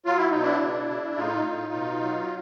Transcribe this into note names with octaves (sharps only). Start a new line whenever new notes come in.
F#3 F4
E4
B2 D#4
D4 E4
C#3
C#3
A2 D#4 F4
A2
B2
F#3